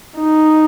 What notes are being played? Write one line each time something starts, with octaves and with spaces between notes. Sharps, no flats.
D#4